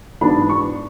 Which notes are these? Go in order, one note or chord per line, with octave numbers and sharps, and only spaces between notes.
G#2 E3 B3 D4 B5
C#6